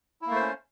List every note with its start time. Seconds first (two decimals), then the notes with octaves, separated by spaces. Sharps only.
0.22 E4
0.26 A#3
0.31 A3
0.36 C5
0.41 C#4